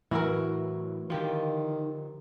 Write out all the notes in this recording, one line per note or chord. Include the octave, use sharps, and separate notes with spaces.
A2 E3 F#3 E4 F#4 A#4
D3 D#3 F3 F4 G4